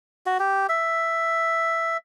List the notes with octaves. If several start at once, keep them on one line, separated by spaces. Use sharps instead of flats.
F#4
G4
E5